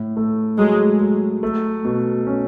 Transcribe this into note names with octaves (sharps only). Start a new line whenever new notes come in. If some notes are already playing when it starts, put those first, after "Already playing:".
Already playing: A2
A3
F#3 G#3
F#3
A3
B2
C#4